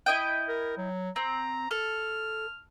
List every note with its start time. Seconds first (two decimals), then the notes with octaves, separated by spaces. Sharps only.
0.06 E4 D#5 G5
0.48 A#4
0.77 F#3
1.16 C4 A#5
1.71 A4 F6